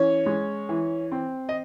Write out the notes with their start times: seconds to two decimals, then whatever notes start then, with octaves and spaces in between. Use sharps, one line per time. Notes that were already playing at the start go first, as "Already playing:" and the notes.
Already playing: E3 C#4 C#5
0.26 G#3
0.69 E3
1.12 C4
1.49 D#5